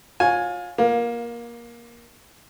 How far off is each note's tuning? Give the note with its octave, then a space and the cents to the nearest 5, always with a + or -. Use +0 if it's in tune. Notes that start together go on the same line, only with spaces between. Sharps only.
F4 +25 C#5 +0 G#5 +0
A#3 +20 F4 +0